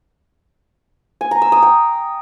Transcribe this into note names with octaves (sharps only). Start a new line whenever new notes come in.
G#5
A#5
E6
D#6
G5